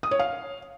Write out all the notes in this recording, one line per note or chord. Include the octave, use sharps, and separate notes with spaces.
D#6
C#5
F5